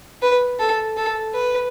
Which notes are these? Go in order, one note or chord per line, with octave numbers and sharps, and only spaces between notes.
B4
A4
A4
B4